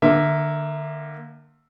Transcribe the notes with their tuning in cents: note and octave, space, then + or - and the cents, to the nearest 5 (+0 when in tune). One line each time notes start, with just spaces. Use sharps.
D3 +30 A#3 +0 E5 +0